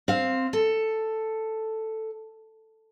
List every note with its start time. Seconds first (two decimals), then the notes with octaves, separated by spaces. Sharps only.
0.08 C4 F5
0.53 A4